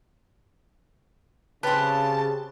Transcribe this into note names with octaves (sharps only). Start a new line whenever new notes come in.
C#3 C4 G4 B4 C5 A5